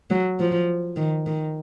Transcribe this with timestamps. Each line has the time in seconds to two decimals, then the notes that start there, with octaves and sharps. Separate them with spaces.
0.10 F#3
0.39 F3
0.97 D#3
1.26 D#3